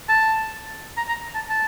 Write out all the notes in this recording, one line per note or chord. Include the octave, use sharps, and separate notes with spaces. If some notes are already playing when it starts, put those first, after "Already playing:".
A5
A#5
A#5
A5
A5